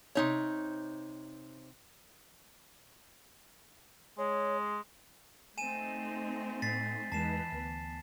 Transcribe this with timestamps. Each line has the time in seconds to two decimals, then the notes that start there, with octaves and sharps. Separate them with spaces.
0.15 C3 D#4 C#5
4.18 G#3 C#5
5.58 A3 C4 D#4 G#5 D#7 E7
6.62 A2 A6 B6 C7
7.12 E2 E3 G#3 D#4 B4 A5 C7 E7
7.52 D2 B3